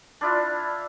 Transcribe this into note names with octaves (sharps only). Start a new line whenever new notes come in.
D4 E4 F4